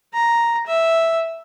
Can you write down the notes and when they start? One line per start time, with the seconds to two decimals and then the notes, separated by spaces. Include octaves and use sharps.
0.13 A#5
0.67 E5